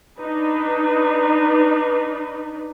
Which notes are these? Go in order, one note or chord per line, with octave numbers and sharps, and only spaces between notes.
D4 D#4 B4